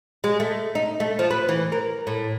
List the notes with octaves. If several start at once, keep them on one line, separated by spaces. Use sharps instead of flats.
G#3
A3
D#4
A3
F3
B4
E3
A#4
A2